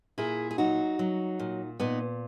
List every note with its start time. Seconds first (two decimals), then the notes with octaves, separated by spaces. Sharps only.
0.18 A#2 E4 G#4
0.51 G#4
0.58 F#3 D#4 F#4
0.99 F#3
1.40 A#2
1.80 A#2 B3 D#4